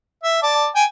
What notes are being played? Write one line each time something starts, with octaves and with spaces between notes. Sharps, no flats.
E5
D5 A5
G5 G#5